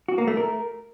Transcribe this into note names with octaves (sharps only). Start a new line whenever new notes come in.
F#4
A#3
A3
A#4